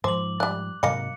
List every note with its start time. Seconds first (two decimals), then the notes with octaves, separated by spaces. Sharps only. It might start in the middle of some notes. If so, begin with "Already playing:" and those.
0.04 G#2 F3 C5 D6 F#7
0.40 G3 D5 F#6
0.83 G#2 C3 F#3 A#3 D#5 F5 C#7